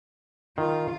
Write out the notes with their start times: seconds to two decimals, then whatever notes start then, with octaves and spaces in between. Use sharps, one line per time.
0.58 D#3 F4